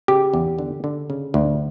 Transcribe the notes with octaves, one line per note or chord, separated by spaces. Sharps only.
C#3 G4
E2
D3
D3
C#3
D2